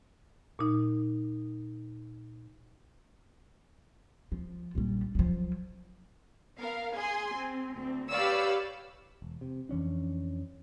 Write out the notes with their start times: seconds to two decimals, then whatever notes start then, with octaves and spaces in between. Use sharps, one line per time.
0.59 A#2 D#4
4.32 F3
4.75 A#1 G3
5.15 F3 F#3
6.60 B3 A#4 F5
6.94 G#4 G#5 C6
7.36 C4
7.74 D2 C4
8.11 G4 B4 C#5 D5 F5 E6
9.22 E1
9.41 C3
9.69 F2 E3 C#4 D4